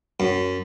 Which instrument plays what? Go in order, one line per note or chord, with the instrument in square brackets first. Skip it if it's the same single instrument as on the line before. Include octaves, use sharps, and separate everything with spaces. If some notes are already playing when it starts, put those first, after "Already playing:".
[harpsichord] F#2